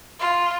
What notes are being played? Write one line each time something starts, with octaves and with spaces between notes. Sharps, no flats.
F4